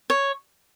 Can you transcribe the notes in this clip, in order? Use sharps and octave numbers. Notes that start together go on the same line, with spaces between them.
C#5